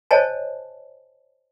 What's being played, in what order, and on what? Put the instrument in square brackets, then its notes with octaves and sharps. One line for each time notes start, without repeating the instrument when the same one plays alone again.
[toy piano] C5 C#5 D#5 G#5 A5